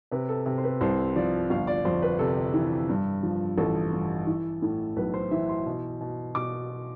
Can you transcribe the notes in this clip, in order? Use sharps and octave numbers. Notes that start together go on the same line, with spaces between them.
C3 B4
A4
C3
C5
B4
C2 C5
F3 D5
G1 F5
D5
F2 C5
B4
C3 A4
E3
G2
F3
A1 A4
G2
E3
A2
B1 B4
C5
E3 E5
C6
B2
B2
B2 D6